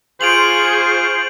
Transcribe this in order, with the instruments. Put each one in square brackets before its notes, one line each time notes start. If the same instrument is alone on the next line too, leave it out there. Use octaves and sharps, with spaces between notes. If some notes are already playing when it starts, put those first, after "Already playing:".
[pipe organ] F4 C6 [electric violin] G#4 C#6 [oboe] C5 [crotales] D7 F7 F#7